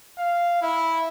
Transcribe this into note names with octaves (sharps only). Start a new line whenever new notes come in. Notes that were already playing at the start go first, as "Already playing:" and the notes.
F5
E4